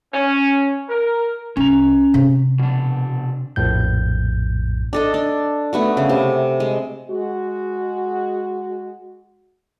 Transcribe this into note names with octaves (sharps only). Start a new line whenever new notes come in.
C#4
A#4
C2 C#4 A#5
C3 C4
B2 D4
A#1 F2 A2 G6
D4 A4 D#5
D4
A3 B3 F#4
C#3
C3
G#3
G#3 F#4